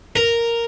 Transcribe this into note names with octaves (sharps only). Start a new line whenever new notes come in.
A#4